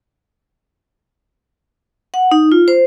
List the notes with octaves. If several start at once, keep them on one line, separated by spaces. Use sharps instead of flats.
F#5
D#4
F4
C5